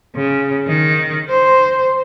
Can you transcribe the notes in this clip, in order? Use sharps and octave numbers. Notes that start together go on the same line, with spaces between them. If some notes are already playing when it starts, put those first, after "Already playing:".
C#3
D#3
C5